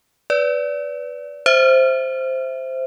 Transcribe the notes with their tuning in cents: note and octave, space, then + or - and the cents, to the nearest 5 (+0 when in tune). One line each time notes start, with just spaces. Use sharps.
B4 +0 D5 -20
C5 +0 E5 +0